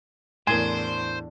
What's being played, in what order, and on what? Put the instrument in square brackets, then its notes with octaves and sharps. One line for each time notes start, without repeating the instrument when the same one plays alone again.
[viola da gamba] E2 D4 [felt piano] A2 A#4 [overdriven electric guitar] C5 [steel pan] G#5 C6